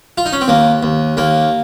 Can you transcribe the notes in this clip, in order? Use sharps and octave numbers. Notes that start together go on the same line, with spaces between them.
F4
D#4
C#4
C4
D#2 A#3
D#2
D#2 A#3